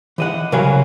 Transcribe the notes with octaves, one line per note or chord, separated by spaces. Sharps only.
E3 D#5 F#5
C2 C#3 F#3 A#4 F5 G#5